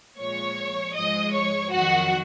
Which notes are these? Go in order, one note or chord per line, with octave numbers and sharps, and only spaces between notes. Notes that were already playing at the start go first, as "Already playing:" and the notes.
A#2 F3 G#3 C#5 C#6
G#2 F3 G#3 D#5 D#6
C#5 C#6
F2 D#3 F#3 F#4 F#5